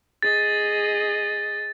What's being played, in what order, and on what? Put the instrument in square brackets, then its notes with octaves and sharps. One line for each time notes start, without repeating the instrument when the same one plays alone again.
[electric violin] G#4 D#5 [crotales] A6